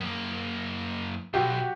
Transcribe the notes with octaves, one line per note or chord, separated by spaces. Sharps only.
F#2 A#3
B1 F#4 G4